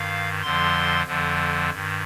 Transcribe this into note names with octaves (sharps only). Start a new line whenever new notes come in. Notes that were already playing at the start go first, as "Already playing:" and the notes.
Already playing: G2 D#3 F5
F2 D3 F3 C6
F2 D3 F3
G2 D#3